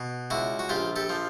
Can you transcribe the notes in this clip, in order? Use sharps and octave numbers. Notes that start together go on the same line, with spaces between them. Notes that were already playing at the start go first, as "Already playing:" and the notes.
Already playing: B2
C#2 E4 F#4
F#4
A#1 F4 G4
G4 A4
F3